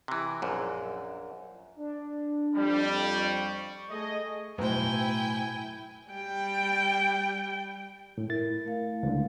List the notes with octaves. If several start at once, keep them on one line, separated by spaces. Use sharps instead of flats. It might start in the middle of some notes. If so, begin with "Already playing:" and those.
C3 E3
A#1 F#2
D4
F2 G3
C#6
A3 G#4 D#5
B1 A2 E4 C5 G5 G#5
G3 G5
A2
E4 A#4 A6
A3 F5
C#2 D3